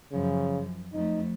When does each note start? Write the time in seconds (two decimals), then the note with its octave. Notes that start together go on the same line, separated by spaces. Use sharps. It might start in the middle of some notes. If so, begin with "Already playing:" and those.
0.12 F#2 C#3 F3
0.93 F2 A3 D#4